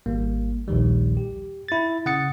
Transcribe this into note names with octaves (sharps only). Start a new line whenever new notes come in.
G#1 G3 A#3
A#1 D#2 D#3 G3
G4
E4 A6
C#3 F#5 D#6 A6 C#7